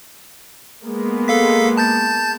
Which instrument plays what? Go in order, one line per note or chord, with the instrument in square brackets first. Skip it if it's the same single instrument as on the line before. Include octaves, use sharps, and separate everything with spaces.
[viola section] G#3 A#3 B3
[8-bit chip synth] A4 F5 B6
A5 G6 A6